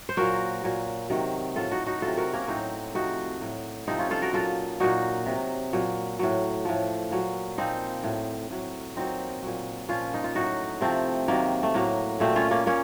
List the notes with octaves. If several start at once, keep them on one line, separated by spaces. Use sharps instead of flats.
C5
A#2 F#3 F#4 A#4
A#2 F#3
C3 D#3 F#3
A2 F#3 F4 A4
D#4 F#4
D#4 F#4
C3 F#3 F4 A4
F#4 A#4
A#3 C#4
A2 F#3 C4 D#4
C3 F3 D#4 F#4
A2 F#3
C3 F3 C4 D#4
C#4 F4
F4 A4
F#4 A#4
A#2 F#3 F4 A4
A#2 F#3 D#4 F#4
C3 F#3
A#2 F#3
A2 F#3
A2 F3
A#2 F#3
A#2 F3 C4 D#4
A2 F#3
A2 F#3
A#2 F#3 C4 D#4
A#2 F#3
A#2 F3 C#4 F4
D#4
F4
A2 F#3 D#4 F#4
C3 F3 A3 C4
C3 D#3 F#3 A#3
A3
A2 F#3 A#3
A#2 F#3 A3 C4
C#4 F4
A#3 C#4
A#2 A#3 C#4